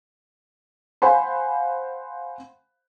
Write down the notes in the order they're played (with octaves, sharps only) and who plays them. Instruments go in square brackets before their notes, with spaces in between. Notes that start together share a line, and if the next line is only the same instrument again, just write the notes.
[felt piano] C5 F5 F#5 G#5 B5 C6